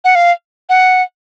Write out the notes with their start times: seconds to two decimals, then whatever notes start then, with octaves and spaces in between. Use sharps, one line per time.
0.04 F#5
0.15 F5
0.69 F#5